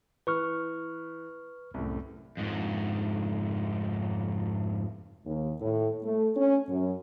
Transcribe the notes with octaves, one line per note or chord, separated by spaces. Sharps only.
E3 B4 C#6 F6
C2 F#2 A2
F2 G#2
D#2
A2
A3
C#4
F#2